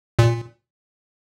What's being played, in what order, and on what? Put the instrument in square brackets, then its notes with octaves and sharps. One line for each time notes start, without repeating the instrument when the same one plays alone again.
[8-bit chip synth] A#2